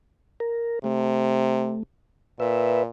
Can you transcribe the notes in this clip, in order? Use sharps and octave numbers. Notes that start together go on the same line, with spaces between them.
A#4
C3 A3
A#2 B4 E5